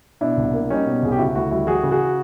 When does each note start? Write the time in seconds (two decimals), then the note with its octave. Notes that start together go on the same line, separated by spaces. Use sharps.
0.21 B2 D4 E4
0.37 C2
0.53 A#3
0.70 G3 C#4 D#4
0.86 B2
1.03 C2 G#4
1.12 G4
1.19 C#3 E4 F#4
1.35 D2 E4 F#4
1.51 G3 E4 F#4
1.67 E3 F#4 G#4
1.83 C#3
1.91 F#4 G#4